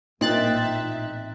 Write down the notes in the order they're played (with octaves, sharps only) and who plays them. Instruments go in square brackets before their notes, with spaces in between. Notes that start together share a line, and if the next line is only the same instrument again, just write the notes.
[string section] A1 E5 [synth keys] A#2 F#6 A6 [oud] C4 [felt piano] D#4